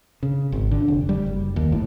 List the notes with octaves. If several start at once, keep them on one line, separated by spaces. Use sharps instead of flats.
C#3
G#1
D3
F1
G3
F#1
D#2
A2